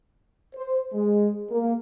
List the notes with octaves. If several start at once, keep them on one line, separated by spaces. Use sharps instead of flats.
C5
G#3
A#3